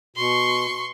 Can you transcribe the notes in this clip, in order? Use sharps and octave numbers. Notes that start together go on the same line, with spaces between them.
B2 C6 C#6